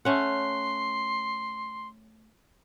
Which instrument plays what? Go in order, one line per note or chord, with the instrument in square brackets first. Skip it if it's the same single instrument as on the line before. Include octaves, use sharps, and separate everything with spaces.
[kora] A3 C#4 F#5 [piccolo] C6